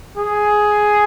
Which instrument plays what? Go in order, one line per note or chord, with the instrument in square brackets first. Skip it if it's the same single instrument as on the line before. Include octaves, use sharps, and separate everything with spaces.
[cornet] G#4